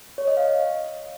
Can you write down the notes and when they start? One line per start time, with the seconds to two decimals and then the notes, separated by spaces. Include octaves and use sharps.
0.18 C#5
0.27 D#5
0.37 F5